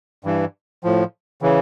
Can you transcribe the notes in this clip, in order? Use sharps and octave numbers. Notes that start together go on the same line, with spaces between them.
G2 E3
A2 F3
C#3 E3